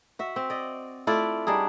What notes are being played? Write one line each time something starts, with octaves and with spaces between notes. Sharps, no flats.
F#4 E5
C4
D5 D#5
A3 E4 F4 D5
G3 D4 D#4 G#4